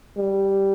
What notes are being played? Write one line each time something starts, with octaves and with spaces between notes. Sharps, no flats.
G3